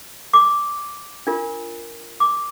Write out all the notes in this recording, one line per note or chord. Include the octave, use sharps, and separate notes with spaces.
D6
D4 F4 A#4
D6